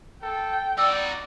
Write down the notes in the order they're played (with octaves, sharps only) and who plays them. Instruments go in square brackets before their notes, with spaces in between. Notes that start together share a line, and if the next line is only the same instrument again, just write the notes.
[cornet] A4 [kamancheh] G5
[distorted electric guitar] D#4 F#4 [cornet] D5 [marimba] E6